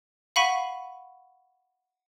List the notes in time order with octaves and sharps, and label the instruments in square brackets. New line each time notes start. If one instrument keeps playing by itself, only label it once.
[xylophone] F5 F#5 B5 C#6 B6 D#7